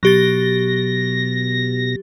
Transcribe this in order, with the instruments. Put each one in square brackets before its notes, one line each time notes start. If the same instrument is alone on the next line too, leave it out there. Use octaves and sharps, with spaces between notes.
[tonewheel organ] B2 A#6 [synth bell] F#3 G4 A6